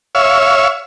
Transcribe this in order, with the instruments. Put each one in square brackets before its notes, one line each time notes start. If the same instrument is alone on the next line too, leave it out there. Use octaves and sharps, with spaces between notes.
[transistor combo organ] C#5 E5 F5